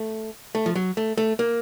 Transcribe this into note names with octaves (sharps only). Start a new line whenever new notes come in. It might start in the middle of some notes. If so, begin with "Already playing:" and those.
Already playing: A3
A3
F3
F#3
A3
A3
A#3